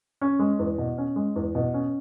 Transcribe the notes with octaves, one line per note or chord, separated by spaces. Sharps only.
C#4
G#3
E2
B2
C#4
G#3
E2
B2
C#4